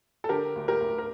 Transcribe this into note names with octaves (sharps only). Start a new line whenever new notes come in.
A4
D3 G4 A#4
D2
G4 A#4
D2
A#4